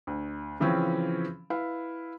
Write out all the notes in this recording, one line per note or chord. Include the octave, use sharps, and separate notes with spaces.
D2
C#3 E3 F3 C4 C#4
E4 B4 F5